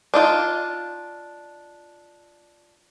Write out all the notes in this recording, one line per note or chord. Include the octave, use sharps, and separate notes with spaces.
D4 D#4 F4